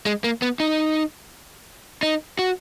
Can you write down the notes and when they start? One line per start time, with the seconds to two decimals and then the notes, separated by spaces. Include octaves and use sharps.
0.06 G#3
0.24 A#3
0.42 B3
0.60 D#4
2.03 D#4
2.39 F#4